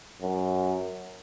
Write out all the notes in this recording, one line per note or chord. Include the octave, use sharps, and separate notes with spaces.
F#2